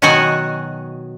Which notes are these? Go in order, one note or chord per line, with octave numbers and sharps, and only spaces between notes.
B2 D#3 F#3 F#4 F#5 G#5